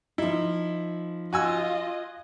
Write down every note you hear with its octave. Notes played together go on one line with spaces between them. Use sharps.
F3 D#4 E4
F4 F#4 D#5 G#5 E6